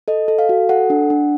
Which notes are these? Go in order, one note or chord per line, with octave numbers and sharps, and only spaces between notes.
A4 D#5
A4
F5
F#4
A4 F#5
D4
D4